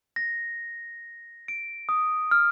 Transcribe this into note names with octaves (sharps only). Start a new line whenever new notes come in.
A#6
D7
D#6
F6